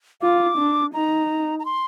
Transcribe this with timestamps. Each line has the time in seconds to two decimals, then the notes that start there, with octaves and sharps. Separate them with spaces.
0.22 F4 D6
0.58 D4
0.94 D#4 A#5
1.59 A#5
1.65 C6